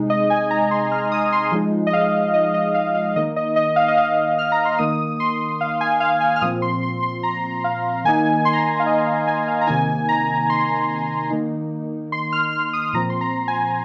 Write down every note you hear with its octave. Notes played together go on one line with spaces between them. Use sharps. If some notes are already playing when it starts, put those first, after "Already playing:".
Already playing: C3 G#3 D#4
D#5
G#5
A#5
C6
F6
D#6
C6
F3 G#3 D#4
D#5
F5
D#5
D#5
F5
F5
D#3 A#3 D#4 D#5
D#5
D#5
F5
D#5
F5
F6
A#5
C6
D#3 A#3 D#4 D#6
C6
F5
G#5
F5
G#5
F6
A#2 F3 C4 D#6
C6
C6
C6
A#5
F5
D#3 A#3 D#4 G#5
C6
A#5
C6
F5
D#5
F5
G#5
F5
A#5
C3 D#3 A#3 D#4 G#5
A#5
C6
D#3 A#3 D#4
C6
F6
F6
D#6
A#2 F3 C4 A#5
C6
A#5
G#5